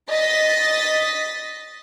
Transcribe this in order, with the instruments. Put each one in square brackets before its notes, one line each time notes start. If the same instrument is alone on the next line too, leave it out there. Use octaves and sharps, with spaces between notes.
[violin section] D#5 A6 B6